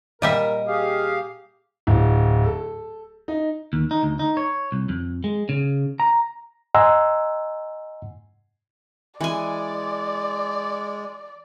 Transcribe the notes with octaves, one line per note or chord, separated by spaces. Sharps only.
A#2 G3 A#4 D#5 E5
G4 G#4 F5
D1
A4
D#4
D#2
D#4
D2
D#4
C#5
C2
F2
G#3
C#3
A#5
D#5 F#5 G#5 A#5 C6 E6
E3 G#3 D5 G#5